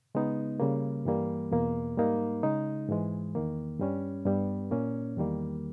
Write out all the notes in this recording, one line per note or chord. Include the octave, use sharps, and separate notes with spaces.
C#3 G#3 B3 D#4
C#3 G3 A#3
G2 E3 G3 A#3
E2 B2 A#3
G#2 G3 A#3 D#4
C#3 G#3 D#4
G#2 E3 G#3
E2 D#3 A#3
G2 G3 C#4
G2 G3 B3
A#2 A#3 C#4
E2 D#3 G3 A#3